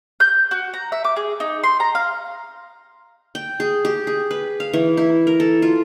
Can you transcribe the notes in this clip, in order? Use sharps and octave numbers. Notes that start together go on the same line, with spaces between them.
G6
F#4
A#5
E5
D6
G#4
D#4
C6
A#5
F5
G5
G#4
G4
G#4
B4
F5
E3
E4
A#4
A4
F4